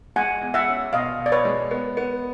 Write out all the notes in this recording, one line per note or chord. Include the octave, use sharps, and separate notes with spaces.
G#3 F#5 G#5
E2
E5 F#5
C#4
B2 D#5 F5
B2
D5
B4 C#5
G#3
B3
B3